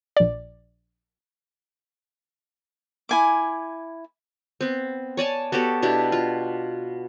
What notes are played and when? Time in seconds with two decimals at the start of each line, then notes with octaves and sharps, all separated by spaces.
0.17 A#1 D5
3.09 E4 G#5 D6
4.61 B3 C4
5.17 C#5 D5 G#5 A5
5.52 B3 F#4 G4 A4
5.82 B2 D4 E4 G4
6.12 F4